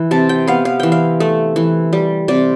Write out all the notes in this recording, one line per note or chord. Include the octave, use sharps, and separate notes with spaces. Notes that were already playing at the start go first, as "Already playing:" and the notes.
Already playing: E3
C3 A5
G5
B3 F5
F5
E3 G5
F5
A3
E3
G3
C3 D5